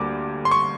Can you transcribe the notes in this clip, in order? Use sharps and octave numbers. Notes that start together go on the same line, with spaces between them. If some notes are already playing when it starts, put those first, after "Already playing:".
Already playing: D2 D3 G3 A#3 D6
C6
C#6